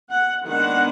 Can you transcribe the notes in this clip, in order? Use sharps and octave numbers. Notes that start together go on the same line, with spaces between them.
F#5
D#3 G#3 B3 D4 F#5